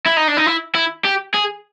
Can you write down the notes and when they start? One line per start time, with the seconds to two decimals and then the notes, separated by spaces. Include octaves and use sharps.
0.06 E4
0.17 D#4
0.28 D4
0.37 D#4
0.46 E4
0.75 E4
1.04 G4
1.34 G#4